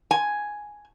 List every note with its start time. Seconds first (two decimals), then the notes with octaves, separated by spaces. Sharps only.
0.11 G#5